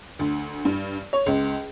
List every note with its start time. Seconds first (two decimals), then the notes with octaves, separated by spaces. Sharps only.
0.19 D2
0.65 G2
1.13 C#5
1.26 C#2